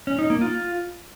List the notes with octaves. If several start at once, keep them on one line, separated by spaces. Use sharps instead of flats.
C#4
D#4
A#3
F4